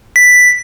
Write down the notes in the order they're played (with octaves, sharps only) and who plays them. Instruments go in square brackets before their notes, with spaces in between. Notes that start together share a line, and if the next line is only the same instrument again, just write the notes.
[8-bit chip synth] B6